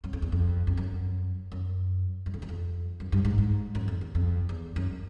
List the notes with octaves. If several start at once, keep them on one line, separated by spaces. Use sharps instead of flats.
F#2
F2
E2
F2
F2
F#2
F#2
F#2
F2
E2
F2
F#2
G2
G#2
G#2
F#2
F2
E2
F2
E2
F#2